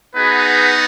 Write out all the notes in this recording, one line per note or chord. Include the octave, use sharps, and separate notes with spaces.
B3 D#4 F#4 G#4 B4